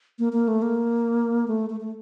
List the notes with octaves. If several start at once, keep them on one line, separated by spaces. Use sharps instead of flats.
A#3
A#3
A3
A#3
A3
A3
A3